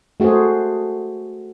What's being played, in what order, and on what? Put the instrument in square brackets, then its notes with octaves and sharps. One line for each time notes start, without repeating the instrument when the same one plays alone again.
[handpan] A3 F#4 G#4 A4 C5